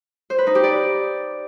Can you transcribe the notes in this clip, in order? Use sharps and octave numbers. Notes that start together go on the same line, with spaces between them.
C5
B4
D#4
G4
D5